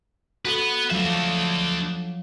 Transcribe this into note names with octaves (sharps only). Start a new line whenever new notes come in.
F#4 A4 B4 F#5
F3 F#3 A3 D4 E5